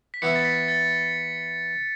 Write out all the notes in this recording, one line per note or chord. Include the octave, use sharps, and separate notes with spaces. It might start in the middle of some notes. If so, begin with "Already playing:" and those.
B6
E3 B3 E4 C#5 E5 C#7
A6
B6
A6